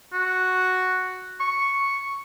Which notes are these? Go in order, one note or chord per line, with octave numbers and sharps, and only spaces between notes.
F#4
C#6